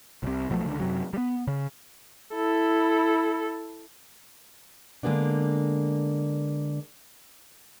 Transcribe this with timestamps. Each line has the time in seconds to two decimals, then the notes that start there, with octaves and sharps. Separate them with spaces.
0.23 C2 C3
0.50 B1 F3 F#3 A3
0.65 C#2 D3
0.80 F#2 C3 F#3
1.13 G3 B3
1.47 C#3
2.35 E4 A4
5.03 D3 G#3 A#3 B3 D4